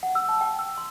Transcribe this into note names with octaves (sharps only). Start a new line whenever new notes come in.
F#5
E6
A5
G5
E6
C6